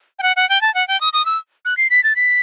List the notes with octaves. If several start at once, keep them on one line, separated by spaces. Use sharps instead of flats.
G5
F#5
F#5
G5
A5
F#5
G5
D#6
D#6
E6
F#6
C7
B6
A6
B6